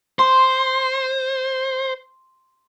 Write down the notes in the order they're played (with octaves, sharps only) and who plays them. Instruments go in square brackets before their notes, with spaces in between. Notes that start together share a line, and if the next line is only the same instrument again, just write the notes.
[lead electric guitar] C5 [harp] C6